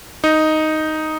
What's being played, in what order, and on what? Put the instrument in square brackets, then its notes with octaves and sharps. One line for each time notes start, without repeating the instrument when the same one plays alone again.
[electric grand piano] D#4